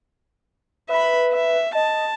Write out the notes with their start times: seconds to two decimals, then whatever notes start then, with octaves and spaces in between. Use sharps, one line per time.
0.89 B4 E5 B5
1.33 E5
1.75 D#5 A5